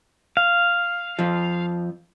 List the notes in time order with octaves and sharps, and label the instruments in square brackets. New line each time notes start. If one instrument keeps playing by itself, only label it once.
[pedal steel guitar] F5
[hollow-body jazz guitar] F2 F3